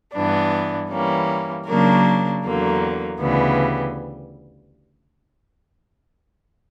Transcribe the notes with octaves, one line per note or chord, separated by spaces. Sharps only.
G2 E3 B3 D4
E3 G3 A#3 C#4
C#3 F#3 A#3 D4 A#4
E2 D3 F#3 A#3
D2 C#3 E3 G3 B3